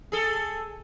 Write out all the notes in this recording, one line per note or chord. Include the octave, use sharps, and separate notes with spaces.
G#4 A4